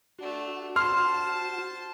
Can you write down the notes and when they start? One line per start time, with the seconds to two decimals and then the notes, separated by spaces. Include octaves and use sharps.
0.18 A3 D4 F#4
0.76 C5 A5 C6 F6